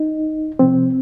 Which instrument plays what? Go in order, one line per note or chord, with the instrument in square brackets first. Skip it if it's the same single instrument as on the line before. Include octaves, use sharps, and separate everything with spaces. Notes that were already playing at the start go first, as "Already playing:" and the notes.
Already playing: [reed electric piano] D#4
C3 F3 C4